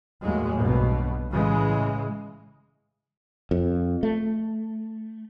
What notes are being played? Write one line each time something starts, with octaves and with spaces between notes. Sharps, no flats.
D#2 A2 F#3 G#3
B1 G2 B2
A2 C#3 E3 G#3
F2
A3